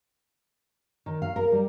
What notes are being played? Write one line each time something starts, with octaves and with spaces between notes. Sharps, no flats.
D#3
F5
A#4
G3